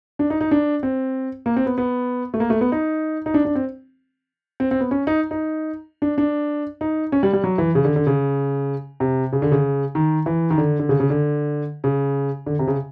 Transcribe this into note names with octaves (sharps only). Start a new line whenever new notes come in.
D4
D#4
D#4
D4
C4
A#3
C4
B3
B3
A3
A#3
A3
B3
D#4
D#4
D4
D4
C4
C4
C4
B3
C#4
D#4
D#4
D4
D4
D#4
C#4
G3
G3
F#3
E3
C#3
D3
D3
C#3
C3
C#3
D3
C#3
D#3
E3
D#3
D3
D3
C#3
C#3
D3
C#3
D3
C3
C#3